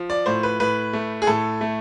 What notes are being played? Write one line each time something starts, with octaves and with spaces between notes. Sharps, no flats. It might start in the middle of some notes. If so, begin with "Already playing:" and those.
Already playing: F3
D5
A2 C5
B4
A2 B4
A3
G#4
A2 A4
A3